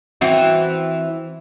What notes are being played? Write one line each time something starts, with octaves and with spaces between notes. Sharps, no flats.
E3 C4 F#4